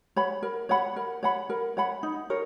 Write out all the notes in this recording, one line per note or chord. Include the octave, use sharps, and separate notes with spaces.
C#5 F#5 B5
A#4
C#5 F#5 B5
A#4
C#5 F#5 B5
A#4
C#5 F#5 B5
D#4
A#4 C#5